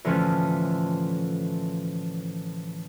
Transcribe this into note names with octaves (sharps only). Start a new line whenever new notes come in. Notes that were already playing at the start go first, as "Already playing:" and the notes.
A2 D3 E3 F3 C#4